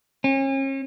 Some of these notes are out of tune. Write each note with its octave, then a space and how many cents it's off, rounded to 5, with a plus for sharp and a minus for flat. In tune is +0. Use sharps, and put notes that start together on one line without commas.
C#4 -40